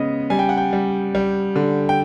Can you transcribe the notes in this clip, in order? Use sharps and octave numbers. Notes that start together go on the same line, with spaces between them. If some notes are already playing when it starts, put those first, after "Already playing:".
Already playing: C#3 G#3 B3 D#5
G3 G#5
G5
F#5
G5
G3
G3
D3
G5